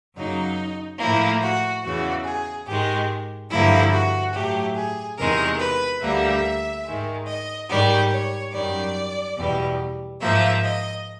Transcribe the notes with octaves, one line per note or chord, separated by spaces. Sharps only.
F#2 C#3 F#3 A#3 D#4
A2 F3 A#3 E4
F#4
E2 C#3 E3 F#4
G#4
G#2 D#3 G#3 G4
G2 D3 F3 A#3 E4
F#4
A2 F#3 A3 G4
G#4
E2 C3 D#3 G#3 A#4
B4
D2 D3 G3 A#3 E5
G#2 D#3 G#3
D#5
G#2 D#3 G3 D5
C#5
F#2 D#3 G3 D5
E2 B2 G3
G#2 F3 A#3 E5
D#5